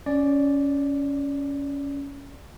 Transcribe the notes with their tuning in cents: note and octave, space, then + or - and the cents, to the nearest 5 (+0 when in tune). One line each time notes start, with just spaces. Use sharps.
C#4 +15 D5 +0